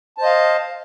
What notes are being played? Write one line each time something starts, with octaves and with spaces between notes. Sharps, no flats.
C5 D#5 F5 A5